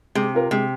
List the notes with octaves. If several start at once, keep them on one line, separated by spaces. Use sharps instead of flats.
C3 G#3
F4 A#4
C3 G#3